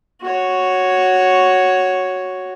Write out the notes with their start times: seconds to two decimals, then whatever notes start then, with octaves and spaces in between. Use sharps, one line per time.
0.21 F#4 C#5